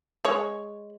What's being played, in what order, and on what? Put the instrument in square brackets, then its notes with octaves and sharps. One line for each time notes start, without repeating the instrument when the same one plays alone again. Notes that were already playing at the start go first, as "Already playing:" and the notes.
[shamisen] G#3 C#5